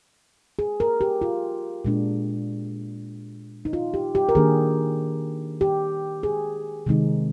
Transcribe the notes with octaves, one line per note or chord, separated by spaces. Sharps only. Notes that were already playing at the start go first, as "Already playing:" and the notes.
G#4
A#4
G4
F4
A#2 G#3 D4
D#4
F4
G4
G4
A#4
D#3 A#3 D4 G#4
G4
G#4
C3 D#3 G#3 C4 D#4